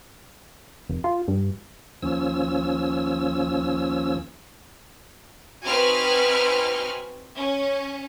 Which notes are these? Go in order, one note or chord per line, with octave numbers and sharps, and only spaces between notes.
F1
F4
G2
D#2 F3 C#4 E6
C4 D#4 F#4 B4 G#5 F6
C#4